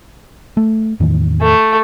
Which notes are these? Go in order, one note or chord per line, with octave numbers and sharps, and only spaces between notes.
A3
E2 A2 D#3
A3